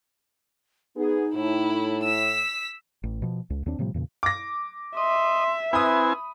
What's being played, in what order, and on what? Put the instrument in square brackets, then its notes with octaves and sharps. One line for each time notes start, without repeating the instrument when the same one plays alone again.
[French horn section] B3 G#4 [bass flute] D#4
[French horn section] A2 [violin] E4
[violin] E6 B6
[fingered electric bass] A1
B2 F3
C#2
D#2 C4 D4
A2 C3 F3 G3
E2 A#2 C#3
[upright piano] D6 A#6
[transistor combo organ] D#5 [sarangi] E5 [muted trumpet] C6
[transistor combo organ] C4 E4 G#5 [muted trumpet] B4 [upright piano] B5 D#6